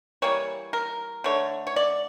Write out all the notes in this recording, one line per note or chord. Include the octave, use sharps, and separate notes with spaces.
E3 G3 A#3 C#5
A#4
D3 A3 C#5
C#5
D5